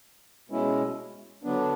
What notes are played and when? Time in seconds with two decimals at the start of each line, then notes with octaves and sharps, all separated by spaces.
0.50 B2 G#3 C#4 E4
1.43 D3 F#3 B3 D4